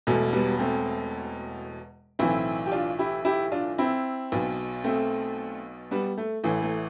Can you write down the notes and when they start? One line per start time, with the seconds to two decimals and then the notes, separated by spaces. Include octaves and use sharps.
0.07 E1 E2 B2 A3
0.33 G3 B3
0.59 A3 C4
2.19 B1 A2 E3 C4 E4
2.66 G4
2.72 D4 F4
2.99 E4 G4
3.25 E4 G4
3.52 D4 F4
3.78 C4 E4
4.32 B1 B2
4.84 A3 C4
5.91 G3 B3
6.18 A3
6.44 A1 A2 E3 A3
6.62 A3